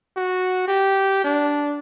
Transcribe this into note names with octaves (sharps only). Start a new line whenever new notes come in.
F#4
G4
D4